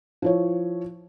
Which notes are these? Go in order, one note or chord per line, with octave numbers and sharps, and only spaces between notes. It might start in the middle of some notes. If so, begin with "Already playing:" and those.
F3 E4 C#5